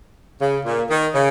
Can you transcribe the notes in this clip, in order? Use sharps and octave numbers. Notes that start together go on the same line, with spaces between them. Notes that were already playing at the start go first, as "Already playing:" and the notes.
C#3
A#2
D#3
C#3